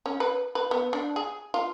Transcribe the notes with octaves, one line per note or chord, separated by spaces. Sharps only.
C#4
B4
B4
B3
D4
G#4
F4